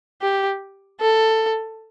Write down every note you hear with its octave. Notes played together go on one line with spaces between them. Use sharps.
G4
A4